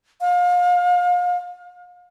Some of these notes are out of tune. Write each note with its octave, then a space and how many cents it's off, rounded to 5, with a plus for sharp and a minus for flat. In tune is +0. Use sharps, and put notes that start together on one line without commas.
F5 +35